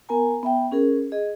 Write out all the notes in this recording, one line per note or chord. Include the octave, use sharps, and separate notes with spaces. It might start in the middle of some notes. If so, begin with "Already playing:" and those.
B3 A#4 G#5 A#5
B3 E5 G5
C#4 G#4 A#4
G#4 D#5